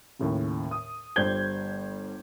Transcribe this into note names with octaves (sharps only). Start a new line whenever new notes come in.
D#2 A2 C#3
D#6
G1 G3 C5 G6 G#6 G7